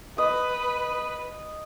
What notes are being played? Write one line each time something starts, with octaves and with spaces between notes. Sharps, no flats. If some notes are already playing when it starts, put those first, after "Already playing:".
B4 D#5